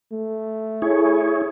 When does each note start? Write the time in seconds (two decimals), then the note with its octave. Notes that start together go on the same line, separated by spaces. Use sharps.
0.12 A3
0.82 E4 G#4 C#5